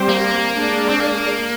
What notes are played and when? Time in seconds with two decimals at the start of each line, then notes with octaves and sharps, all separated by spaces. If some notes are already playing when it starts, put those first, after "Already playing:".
Already playing: G3 C4 G4 C5
0.09 A#3
0.54 G#3 D4 G#4 D5
0.90 C4
1.01 A#3